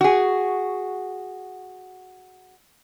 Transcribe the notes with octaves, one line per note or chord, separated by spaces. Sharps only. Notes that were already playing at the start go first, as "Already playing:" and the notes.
F#4 G#4